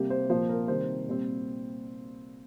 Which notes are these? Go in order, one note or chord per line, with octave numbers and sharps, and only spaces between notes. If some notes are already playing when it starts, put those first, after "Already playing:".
Already playing: C3 G3 A#3 G4
C5
A#2 F3 A#3 C5
A#4
C3 D#3 G3 C5
A#2 G3 C4